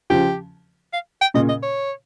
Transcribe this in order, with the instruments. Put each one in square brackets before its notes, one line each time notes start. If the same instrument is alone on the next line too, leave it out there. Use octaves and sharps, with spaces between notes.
[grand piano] C#3 F3 [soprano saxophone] G4
[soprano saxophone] F5
G5
[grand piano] A#2 C#3 [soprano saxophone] D#5
[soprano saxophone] D#5
C#5